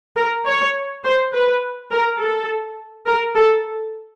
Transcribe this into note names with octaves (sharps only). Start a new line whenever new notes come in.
A#4
C#5
C5
B4
A#4
A4
A#4
A4